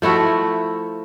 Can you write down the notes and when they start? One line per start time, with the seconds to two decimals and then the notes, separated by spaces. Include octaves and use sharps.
0.02 F3 A3 E4 F#4